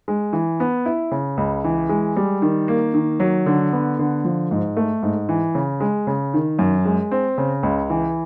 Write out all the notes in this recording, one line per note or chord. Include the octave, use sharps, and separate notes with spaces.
G#3
E3
B3
E4
C#3
C#2
E3
G#3
G3
D#3
A#3
D#3
F#3
D3
B3
D3
F3
G#2
A3
G#2
E3
C#3
G#3
C#3
D#3
F#2
G#3
C4
C#3
C#2
E3